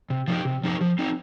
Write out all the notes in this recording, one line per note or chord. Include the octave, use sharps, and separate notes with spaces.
C3
F3 D#4 G4
C3
F3 D#4 G4
F3
C4 D#4